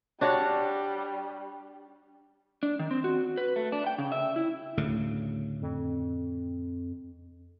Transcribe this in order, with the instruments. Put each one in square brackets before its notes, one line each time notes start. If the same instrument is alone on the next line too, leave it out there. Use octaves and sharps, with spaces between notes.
[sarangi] G3 [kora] D4 F#4 C#5
[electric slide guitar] D4
D#3
C4
F#4
B4
A3
D4
G5
C#3
E5
E4
[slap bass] D2 A2 C#3
[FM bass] F2